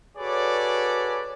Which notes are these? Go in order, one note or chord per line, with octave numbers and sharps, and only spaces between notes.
F#4 G#4 A4 B4 C#5 D5